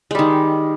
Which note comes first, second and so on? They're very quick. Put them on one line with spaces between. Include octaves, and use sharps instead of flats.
G#3 G3 D#3